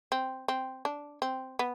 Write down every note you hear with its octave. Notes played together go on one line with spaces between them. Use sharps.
C4
C4
D4
C4
B3